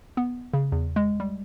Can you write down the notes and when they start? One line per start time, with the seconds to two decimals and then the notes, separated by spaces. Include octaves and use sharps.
0.17 B3
0.54 C#3
0.72 E2
0.96 G#3
1.20 G3